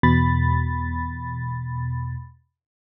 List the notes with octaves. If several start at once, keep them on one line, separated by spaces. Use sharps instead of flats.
E2 B2 B5 A6